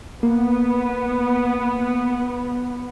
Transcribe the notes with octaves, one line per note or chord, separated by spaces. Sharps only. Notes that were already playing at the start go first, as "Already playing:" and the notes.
A#3 B3